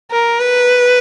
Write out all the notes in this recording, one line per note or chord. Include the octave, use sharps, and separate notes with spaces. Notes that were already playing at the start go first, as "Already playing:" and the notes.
A#4
B4